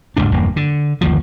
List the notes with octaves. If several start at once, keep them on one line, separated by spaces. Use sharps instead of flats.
F#1 D2 G#2 D4
F1 E2 G2 A#3
D3
G1 D#2 F3